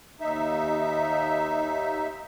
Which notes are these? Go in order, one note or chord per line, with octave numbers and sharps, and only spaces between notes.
D#2 D#4 E5